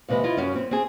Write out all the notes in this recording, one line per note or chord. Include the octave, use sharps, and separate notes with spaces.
D#2 C3 G#3 B4 D#5
E4 F4 D#5
F#2 C#4
C4
C4 G#4